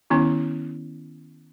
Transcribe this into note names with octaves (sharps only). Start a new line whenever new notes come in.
D#3 B3 C#4 E4